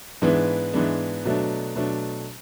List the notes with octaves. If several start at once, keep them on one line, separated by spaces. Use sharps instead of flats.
G#2 E3 G#3 B3 D4
G#2 E3 G#3 B3 D4
B2 F#3 A3 D4
B2 F#3 A3 D4